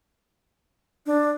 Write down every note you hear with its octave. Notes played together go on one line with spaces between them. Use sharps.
D4